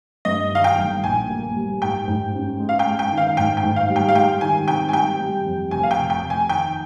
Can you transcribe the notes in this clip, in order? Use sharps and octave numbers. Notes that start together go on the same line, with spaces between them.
G2 D#5
D#3 F5
G5
G1
A#1 G#5
A#3
G3
G#2 G5
G#2
C#4
G#3
F5
G5
G#3
G5
D#3
F5
G#2 G5
G5
G#2
F5
G3
G5
F5
G#3 G5
D#3 G#5
C3 G5
G#5
G3 G5
G3
F2
F1 G#5
F5
G5
F1
G5
F1
G#5
D#3 G5